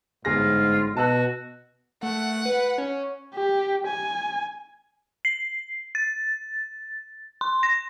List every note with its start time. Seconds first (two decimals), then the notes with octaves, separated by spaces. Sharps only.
0.25 G1 G#2 F4 G#4 A#6
0.97 B2 F#4 A5 E6 F#6
2.03 A3 F#5
2.46 B4
2.78 C#4
3.35 G4
3.87 G#5
5.25 C7
5.95 A6
7.41 C6
7.63 A#6